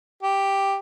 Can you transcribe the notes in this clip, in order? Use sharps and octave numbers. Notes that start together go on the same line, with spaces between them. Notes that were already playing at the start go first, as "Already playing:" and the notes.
G4